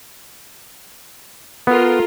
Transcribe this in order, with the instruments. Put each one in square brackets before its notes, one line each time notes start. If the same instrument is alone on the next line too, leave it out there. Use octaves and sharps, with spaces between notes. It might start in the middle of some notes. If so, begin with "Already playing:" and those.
[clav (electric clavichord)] B3 [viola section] F4 A4 A#4